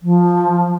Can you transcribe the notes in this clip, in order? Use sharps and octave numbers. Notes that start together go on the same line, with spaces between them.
F3